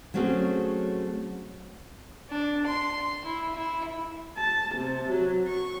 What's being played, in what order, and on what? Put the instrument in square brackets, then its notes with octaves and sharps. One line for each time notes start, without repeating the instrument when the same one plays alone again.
[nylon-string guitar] F#3 A3 C4 C#4 F#4 G#4
[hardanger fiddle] D4
C6
E4
E4
[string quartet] A5
C3
F#3
C#6